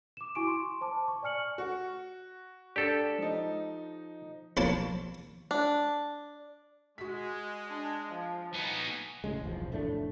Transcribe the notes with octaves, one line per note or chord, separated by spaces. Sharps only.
D6 E7
E4 F#4 G#5 C#6 D6 D7
C6
C5 A5 D6
C#6
D5 G#5 F6 C#7 F#7
F#4
D4 G4 A4
F3 D#4
B1 F3 F#3 A#3 A5
D4
G#3 F#4 B6
D4
F3
B3 D#4 G#5
G#1 A2 C#3 G#3
E1 B1 E2 F3
F1 A2 A3 D4